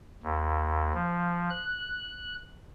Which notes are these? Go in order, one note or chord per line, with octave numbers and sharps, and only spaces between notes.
D#2
F3
F#6